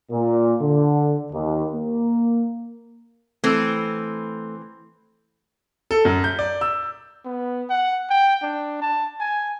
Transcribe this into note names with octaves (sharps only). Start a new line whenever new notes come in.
A#2
D3
D#2
A#3
E3 A3 C4 A4 E6
A4
F#2
G6
D5
E6
B3
F#5
G5
D4
A5
G#5